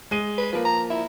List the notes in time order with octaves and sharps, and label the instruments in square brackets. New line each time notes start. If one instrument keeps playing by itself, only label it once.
[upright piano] G#3 D#7
[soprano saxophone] B4
[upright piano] F3 A#3 [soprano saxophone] B4
[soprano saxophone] A#5
E4